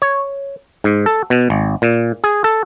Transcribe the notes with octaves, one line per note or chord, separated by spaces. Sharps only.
C#5
G#2
A4
B2
G#1
A#2
G#4
A4